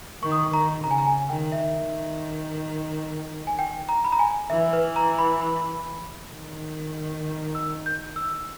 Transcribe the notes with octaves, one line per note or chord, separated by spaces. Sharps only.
D#3 C#6
D#6
C#6
D#3 A#5
C#3 A#5
G#5
A#5
G#5
D#3 G5
E5
D#3
G#5
G5
A#5
B5
A#5
G#5
E3 E5
B4
A#5
B5
B5
D#3
E6
G6
E6